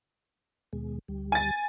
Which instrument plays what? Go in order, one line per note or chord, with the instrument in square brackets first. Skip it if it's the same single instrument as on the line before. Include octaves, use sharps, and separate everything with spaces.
[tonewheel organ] D#2 B2 G#3
D2 G3
[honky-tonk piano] G#5 A6